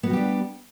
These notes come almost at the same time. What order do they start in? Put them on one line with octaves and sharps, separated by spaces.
B3 F#4 G3 G4 D4